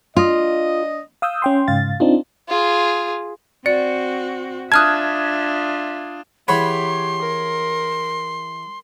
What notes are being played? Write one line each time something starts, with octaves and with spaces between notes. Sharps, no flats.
D4 F4 D#5
F5 D#6 E6 G6
C#4 G5 C6
G#2 C#3 F5 A6
C4 D4 D#4 F4
F4 G#4
C4 F#4 D5 C#7
D4 F4 E5 A5 D#6 F6 F#6 G#6
E3 G4 G#4 C#5 F#5 B5 C6
A#4